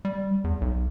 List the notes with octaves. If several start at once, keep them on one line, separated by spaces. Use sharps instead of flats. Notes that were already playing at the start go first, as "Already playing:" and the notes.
G3
E2
B1